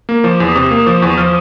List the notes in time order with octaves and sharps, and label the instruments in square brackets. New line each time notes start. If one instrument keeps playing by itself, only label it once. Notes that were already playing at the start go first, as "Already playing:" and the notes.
[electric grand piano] A#3
[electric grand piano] F3 [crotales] D6
[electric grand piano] E2
[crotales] D#6
[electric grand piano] C3 [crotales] D6
[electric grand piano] A#3 [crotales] D#6
[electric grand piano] F3 [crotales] D6
[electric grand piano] E2 [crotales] C#6
[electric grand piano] F3 [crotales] F6